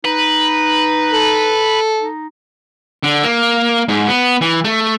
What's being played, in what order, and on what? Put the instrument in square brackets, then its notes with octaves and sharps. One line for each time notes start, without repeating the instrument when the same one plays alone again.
[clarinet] D#4 [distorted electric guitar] B4
[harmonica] A4
[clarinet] D#4
[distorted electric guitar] D3
A#3
G#2
B3
E3
A3